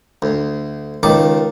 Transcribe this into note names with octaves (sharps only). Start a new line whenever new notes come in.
D2
C#2 D#3 A5 D6